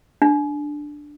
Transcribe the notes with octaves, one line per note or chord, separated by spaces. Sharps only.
D4